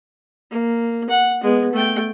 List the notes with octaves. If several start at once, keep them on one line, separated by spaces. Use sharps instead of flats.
A#3
F#5
G#3 B3
A3 G5